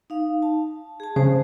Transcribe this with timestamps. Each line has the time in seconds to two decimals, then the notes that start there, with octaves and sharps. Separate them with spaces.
0.10 D#4 F5
0.42 A5
1.00 G#4 A5
1.16 C#3 C5